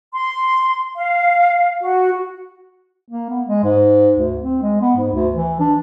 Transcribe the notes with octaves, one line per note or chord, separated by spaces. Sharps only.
C6
F5
F#4
A#3
B3
G#3
G#2
D2
C4
G#3
B3
G#2
D2
E3
D4